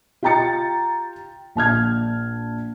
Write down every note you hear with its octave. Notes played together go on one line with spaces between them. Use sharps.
F4 G4 G5 A#5 A6 C#7
A#1 A5 F6 G#6